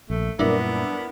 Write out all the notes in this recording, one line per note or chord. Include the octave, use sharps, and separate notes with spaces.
A#1 A3
F#2 A#2 G3 B3 D4 E4 A#4